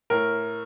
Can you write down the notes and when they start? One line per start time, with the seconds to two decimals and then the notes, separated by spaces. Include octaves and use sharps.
0.10 A2 A#4